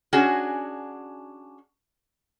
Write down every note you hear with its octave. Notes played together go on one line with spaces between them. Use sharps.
C#4 D4 F#4 G#4